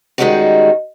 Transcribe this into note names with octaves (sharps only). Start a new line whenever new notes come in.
D#3 G3 G#3 C#4 D#4 F#4